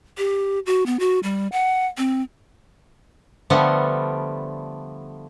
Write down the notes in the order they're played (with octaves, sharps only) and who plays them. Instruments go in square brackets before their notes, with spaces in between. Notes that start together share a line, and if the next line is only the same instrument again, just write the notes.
[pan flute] G4
F#4
B3
F#4
G3
F#5
C4
[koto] D3 F3 G3 A3 B3